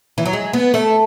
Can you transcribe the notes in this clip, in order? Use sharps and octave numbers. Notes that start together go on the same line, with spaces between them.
E3
F#3
G#3
B3
A3